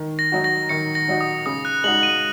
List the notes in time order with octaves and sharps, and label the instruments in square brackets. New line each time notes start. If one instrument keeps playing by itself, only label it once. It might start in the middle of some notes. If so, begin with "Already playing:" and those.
Already playing: [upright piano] D#3
[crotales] A#6
[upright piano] F#3 D#4 F#4
[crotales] A#6
[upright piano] D#3 [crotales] C#7
[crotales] A#6
[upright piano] F#3 D#4 F#4
[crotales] D#6
[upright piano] C#3 [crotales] D#6
[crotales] F#6
[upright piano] G#3 D#4 F#4 [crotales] F#7
[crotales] D#7